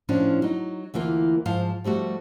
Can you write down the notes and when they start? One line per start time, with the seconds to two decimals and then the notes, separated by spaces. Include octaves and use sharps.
0.09 A2 F3 C#4 D4
0.42 F#3 D#4
0.94 D2 E3 A#3 F4
1.45 G#2 F3 F5 A5
1.84 F3 G3 A3 F#4